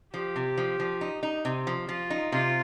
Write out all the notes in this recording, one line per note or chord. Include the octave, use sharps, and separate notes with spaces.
F3 G4
C3
F3
F3
D#4
D#4
C3
F3
F3 F4
D#4
C3 F4